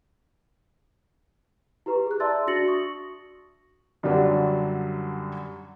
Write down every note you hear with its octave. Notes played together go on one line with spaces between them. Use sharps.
E4 G4 B4 A#5 C#6
G#4 F#6
D5 E5 A5 C6 E6 A6
D4 F#4 A6 A#6 C#7 F#7
C#6 D#6
F#2 D3 F#3 G3 D4